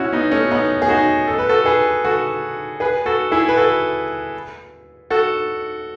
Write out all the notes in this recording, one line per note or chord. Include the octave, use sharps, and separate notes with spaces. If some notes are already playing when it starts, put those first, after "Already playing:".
Already playing: C#4 E4 F#4
B3 D#4
A3 C#4
B3 D#4
G#4
D#4 F#4
A4
B4
F#4 A4
G#4 B4
F#4 A4
G#4 B4
F#4 A4
E4 G#4
B4
F#4 A4
F#4 A4